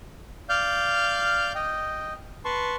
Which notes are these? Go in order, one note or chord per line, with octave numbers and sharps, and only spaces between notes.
D5 F5 F6 G6
D#5 G5
B4 A5 C6 C#6